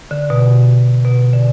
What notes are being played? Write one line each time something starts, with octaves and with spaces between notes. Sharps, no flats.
D3
B2
B2
D3